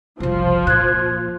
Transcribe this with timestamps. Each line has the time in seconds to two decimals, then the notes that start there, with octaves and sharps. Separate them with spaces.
0.20 F#1 C2 F3
0.67 A#2 F#6 G#6